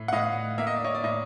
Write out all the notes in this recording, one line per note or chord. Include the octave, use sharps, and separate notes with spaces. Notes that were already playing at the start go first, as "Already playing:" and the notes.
Already playing: A2
F#5
A2 D#5 F5
A#3 E5
D#5
D5
C#5 D#5
D5
A2 C#5 D#5